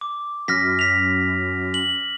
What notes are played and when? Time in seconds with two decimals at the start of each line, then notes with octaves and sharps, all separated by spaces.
0.01 D6
0.48 F#2 F6 A#6 B6
0.79 B6 F7
1.74 F#7